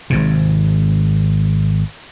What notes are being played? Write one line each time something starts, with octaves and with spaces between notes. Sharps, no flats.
G#1 G#2 C3